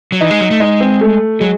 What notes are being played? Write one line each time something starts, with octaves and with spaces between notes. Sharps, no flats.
F#3
E3 D#4
G#3
F#3
A3
G#3 D#4
C4
A3
F#3 G#3